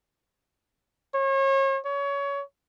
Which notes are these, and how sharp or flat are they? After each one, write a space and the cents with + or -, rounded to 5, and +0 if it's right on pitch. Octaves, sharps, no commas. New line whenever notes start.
C#5 -35
C#5 +25